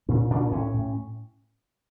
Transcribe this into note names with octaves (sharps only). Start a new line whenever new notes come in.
A#2 C#4
A#2 D4
A2 C#4
A2